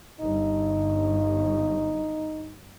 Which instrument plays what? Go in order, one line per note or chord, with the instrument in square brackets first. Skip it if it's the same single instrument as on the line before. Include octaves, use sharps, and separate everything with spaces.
[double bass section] G1 [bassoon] D#4